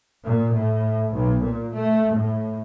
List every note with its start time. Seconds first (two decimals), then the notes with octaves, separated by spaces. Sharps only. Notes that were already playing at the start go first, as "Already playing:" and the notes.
0.24 A#2
0.55 A2
1.14 B1
1.44 A#2
1.77 A3
2.14 A2